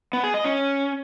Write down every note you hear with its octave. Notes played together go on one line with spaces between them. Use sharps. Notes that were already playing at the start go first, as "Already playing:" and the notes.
B3
G#4
D#5
C#4